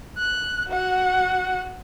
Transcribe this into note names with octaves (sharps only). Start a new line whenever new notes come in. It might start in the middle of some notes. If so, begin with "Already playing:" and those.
F#6
F#4 F#5